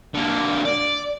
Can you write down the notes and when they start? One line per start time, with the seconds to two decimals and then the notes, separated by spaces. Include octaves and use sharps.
0.14 D3 A#3
0.65 D5